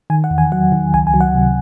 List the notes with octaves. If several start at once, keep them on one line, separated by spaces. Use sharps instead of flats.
D#3 G#5
F#5
E2
G#5
F#3 F#5
D#3
C#2 G#5
G#5
F#3
F#5
C3